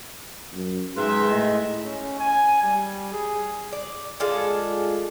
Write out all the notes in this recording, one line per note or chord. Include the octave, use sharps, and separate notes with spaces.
F#2
G#2 D#3 G#4 B4 E5 C6
A2 D#5
C#4
G#5
G3
G#4
D5
G#3 D4 F4 A4